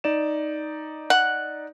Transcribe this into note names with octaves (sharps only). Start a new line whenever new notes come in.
D#4 D5 E7
F#5